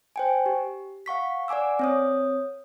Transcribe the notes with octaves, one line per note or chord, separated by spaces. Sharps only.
C5 G5 G#5
G4
F5 F#5 C#6 B6
D5 F#5 G#5 D6 E6
C4 C#5 D#6